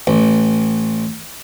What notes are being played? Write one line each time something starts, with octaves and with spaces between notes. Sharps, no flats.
A1